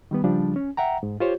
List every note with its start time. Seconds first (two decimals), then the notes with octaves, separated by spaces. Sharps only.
0.11 D#3 G3 B3
0.24 C#3 F3 G3 D4
0.56 C#4
0.77 E5 F#5 G5 A#5
1.03 G#2
1.20 F4 G4 C5 C#5